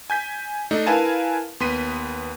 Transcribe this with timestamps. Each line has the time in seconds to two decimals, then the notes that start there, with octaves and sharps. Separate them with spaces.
0.10 G#5 G6 B6
0.71 A3 D4 D#4
0.86 E4 A#4 B4 F5 G#5 A5
1.60 D#2 B3 C6 B6 D#7